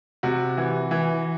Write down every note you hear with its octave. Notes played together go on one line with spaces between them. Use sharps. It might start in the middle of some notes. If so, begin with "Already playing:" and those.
C3 F#4
E3
E3